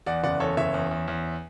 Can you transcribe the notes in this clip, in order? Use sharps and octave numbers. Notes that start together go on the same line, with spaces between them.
E2 D5 F#5
F#1 D5 F#5
E2 A4 C#5
F#1 C#5 E5
E2
E2
E2